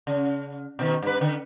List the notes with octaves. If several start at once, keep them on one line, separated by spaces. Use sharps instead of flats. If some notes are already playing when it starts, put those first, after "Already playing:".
C#3
B2 D#3
G2 B4
D3